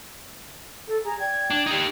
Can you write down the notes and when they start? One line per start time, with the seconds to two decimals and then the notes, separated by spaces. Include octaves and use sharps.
0.87 A4
1.03 G#4 A#5
1.19 D5 G5 G#6
1.50 D4
1.66 D#4 G4